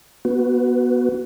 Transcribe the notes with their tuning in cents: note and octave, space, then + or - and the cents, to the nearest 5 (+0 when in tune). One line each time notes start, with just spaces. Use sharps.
B3 -20 F#4 +0 B4 +5